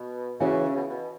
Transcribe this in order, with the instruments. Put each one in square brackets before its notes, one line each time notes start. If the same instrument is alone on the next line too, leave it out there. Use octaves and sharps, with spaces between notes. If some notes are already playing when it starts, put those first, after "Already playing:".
Already playing: [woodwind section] B2
[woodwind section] C#3 [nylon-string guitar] E3 C#4 F#4
[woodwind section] B2
B2